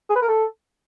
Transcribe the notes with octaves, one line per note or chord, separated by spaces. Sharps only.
G#4
B4
A#4
A4